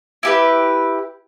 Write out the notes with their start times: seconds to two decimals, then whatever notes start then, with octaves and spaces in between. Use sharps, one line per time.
0.23 E4 G4 B4